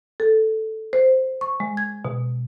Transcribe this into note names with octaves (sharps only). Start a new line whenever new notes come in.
A4
C5
C#6
G#3
G#6
B2